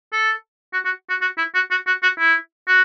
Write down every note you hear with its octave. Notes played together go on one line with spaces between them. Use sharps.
A4
F#4
F#4
F#4
F#4
E4
F#4
F#4
F#4
F#4
E4
F#4